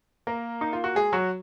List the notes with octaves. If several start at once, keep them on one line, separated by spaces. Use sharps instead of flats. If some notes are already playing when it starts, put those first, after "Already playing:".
A#3 A#4
D#4
F4
F#4
G#3 G#4
F#3 F#4